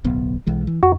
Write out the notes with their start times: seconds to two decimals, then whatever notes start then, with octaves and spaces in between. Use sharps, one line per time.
0.04 D1 B1 B3
0.47 B1 E3 G#3
0.67 E3
0.83 F2 F#4